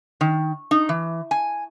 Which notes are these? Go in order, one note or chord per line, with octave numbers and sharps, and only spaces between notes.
D#3
D#4
E3
G#5